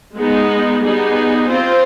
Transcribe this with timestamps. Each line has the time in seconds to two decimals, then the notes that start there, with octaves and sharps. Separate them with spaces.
0.18 G#3 B3 D#4
0.83 G3 B3 D#4 G#4
1.49 C4 F4 C5